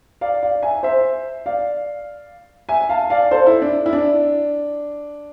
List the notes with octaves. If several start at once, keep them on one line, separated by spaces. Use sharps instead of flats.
D5 F5
D5 F5
E5 G#5
C5 E5
D5 F5
E5 G#5
F5 A5
D5 F5
A4 C5
E4
D4
E4
D4